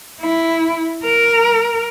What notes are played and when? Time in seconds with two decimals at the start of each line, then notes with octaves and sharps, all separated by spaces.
0.21 E4
1.04 A#4